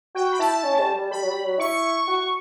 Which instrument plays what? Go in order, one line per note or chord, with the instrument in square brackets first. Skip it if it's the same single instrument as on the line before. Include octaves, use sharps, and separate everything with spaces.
[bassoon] F#4 [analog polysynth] G5
[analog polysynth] B5
[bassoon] E4 [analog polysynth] A5
[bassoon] C#4
G3
G3
[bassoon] G3 [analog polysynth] B5
[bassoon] F#3
G3
F#3
[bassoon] E4 [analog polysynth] C#6
[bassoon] F#4